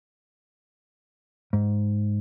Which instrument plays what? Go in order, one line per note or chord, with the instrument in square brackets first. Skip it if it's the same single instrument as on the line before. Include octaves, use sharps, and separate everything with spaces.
[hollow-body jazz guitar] G#2